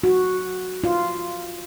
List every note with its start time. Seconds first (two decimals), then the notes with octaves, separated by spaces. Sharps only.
0.04 F#4
0.84 F4